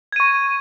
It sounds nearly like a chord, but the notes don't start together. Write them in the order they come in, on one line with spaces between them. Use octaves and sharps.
G#6 D#7 C#6